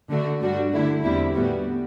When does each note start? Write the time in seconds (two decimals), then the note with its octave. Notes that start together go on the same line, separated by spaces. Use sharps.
0.09 D3 A3 D4 F#4
0.41 G2 D3 G3 D4 F#4
0.72 D3 A3 E4
1.03 E2 D3 G3 C4 E4
1.34 A2 G3 B3 F#4